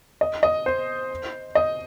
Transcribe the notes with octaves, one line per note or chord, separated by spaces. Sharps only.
D#5
D#5
C5
D#5